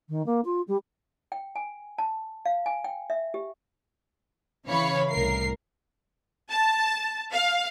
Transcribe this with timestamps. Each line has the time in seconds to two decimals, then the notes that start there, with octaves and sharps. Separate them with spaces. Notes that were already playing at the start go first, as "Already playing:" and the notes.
0.09 D#3
0.25 A#3
0.44 F4
0.67 G3
1.32 G5
1.56 G#5
1.98 A5
2.45 F5
2.66 G#5
2.84 G5
3.10 E5
3.34 G4
4.66 C#3 E3 C#5 F5 B5 C#7
5.10 C2 A2 A#4 C7
6.51 A5
7.32 F5